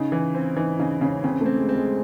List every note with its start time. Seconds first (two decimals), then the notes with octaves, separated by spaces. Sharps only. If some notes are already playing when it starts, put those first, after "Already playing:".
Already playing: C#3 D#4
0.12 E3
0.34 C4
0.56 E3 D#4
0.79 C#3 D#4
1.01 C#3 C#4
1.24 C#3 C4
1.41 A3
1.46 C4
1.58 G#3
1.69 C4
1.75 G#3